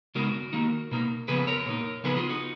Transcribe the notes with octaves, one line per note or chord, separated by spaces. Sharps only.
C#3 G#3 B3 D#4 F#4 A#4
D#3 A#3 D#4
B2 A#3 D#4
C#3 F3 B3 G#4 B4
A#4 C#5
A#2 G#3 D#4
C#3 F3 B3 D#4 G#4 B4
F4 G#4
D#4 F#4